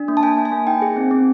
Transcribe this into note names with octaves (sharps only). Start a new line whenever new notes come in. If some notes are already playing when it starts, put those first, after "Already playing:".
Already playing: D4
A#3
A5
A#3 G#5
A#3
G#5
A#3
D#4 G5
G#4
C4
C4